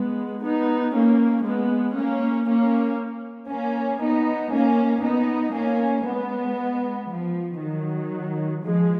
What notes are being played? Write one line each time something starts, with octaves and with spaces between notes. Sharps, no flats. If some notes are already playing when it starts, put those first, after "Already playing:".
Already playing: G#3 B3
B3 D#4
A#3 C#4
G#3 B3
A#3 C#4
A#3 C#4
A#3 C#4
B3 D#4
A#3 C#4
B3 D#4
A#3 C#4
G#3 B3
F3
D#3 F#3
F3 G#3